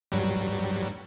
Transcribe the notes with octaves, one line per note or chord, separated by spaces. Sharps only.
G2 F#3 G3